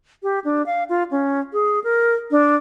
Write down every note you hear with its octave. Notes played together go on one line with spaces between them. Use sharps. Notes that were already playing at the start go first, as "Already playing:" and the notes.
G4
D4
F5
F4
C#4
G#4
A#4
D4